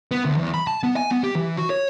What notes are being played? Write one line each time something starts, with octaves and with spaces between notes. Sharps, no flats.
B3
D2
E2
B5
A5
B3
G#5
B3
G4
E3
F#4
C#5